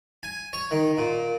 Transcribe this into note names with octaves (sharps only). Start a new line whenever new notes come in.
G#5
C#5
D#3
A#2